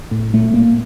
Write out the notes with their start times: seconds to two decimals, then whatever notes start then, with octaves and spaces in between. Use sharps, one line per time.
0.11 A2
0.33 A#2 A3
0.54 A#2 A#3